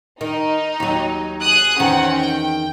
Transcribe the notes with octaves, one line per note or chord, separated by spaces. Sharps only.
D#3 D#4
D#2 F#3
G#4 D#6 F#6
E2 D#3 C4 C#4 F#5
G5